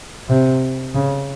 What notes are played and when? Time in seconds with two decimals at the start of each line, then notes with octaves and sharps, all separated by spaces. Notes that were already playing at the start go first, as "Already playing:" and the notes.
0.29 C3
0.95 C#3